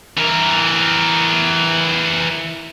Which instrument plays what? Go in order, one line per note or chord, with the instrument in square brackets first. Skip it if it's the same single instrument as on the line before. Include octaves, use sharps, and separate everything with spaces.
[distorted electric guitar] E3 A#4